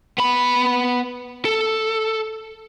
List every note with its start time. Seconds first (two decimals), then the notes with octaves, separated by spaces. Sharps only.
0.18 B3 B5
1.45 A4